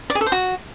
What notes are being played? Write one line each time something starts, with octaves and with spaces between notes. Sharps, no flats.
D5
G#4
A4
C5
F#4